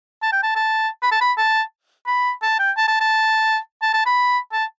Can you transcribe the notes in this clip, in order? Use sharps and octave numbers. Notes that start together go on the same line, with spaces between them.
A5
G5
A5
A5
B5
A5
B5
A5
B5
A5
G5
A5
A5
A5
A5
A5
B5
A5